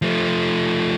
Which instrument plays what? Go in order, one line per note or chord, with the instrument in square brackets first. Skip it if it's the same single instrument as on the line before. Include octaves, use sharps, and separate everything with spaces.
[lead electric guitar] F3 A3